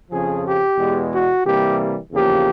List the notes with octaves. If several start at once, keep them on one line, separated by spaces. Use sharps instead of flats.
F2 C#3 F3 G#4
G4
E2 B2 G#3
F#4
C3 E3 G3 A#3 G4
E2 C#3 F3 A#3 G4